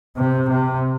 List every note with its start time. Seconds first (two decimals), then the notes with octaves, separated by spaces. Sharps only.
0.17 C3
0.49 C3